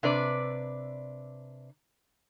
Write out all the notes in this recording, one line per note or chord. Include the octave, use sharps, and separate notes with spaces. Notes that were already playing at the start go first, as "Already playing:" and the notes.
C3 D4 B4 D5